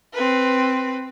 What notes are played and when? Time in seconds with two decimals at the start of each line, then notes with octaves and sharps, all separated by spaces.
0.13 C4 B4